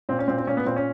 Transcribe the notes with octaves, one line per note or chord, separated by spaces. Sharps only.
A#2 C4
C#4
A#2 C4
C4
A#2 C#4
B3
A#2 C4
C#4